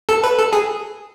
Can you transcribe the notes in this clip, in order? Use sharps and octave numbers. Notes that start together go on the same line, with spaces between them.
A4
B4
A4
G#4